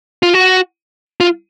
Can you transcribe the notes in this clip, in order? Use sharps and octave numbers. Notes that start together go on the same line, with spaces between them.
F4
F#4
F4